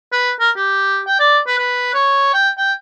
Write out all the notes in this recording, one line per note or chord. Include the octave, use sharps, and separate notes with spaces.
B4
A#4
G4
G5
D5
B4
B4
C#5
G5
G5